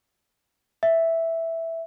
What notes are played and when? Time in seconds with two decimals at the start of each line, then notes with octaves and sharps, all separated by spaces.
0.83 E5